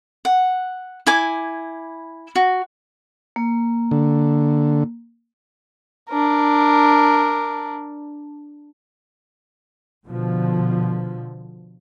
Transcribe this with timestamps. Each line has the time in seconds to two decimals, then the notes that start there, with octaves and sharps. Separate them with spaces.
0.25 F#5
1.07 E4 G#5 D6
2.36 F#4
3.36 A#3
3.91 D3
6.10 D4 A#4
10.07 B2 D3 F3